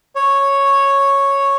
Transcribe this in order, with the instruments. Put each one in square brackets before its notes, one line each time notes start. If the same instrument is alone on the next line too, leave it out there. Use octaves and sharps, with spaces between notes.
[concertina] C#5